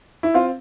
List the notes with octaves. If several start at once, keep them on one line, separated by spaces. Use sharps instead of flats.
E4
C4 F4